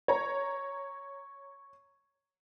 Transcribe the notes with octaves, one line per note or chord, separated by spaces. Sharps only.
C#5 A#5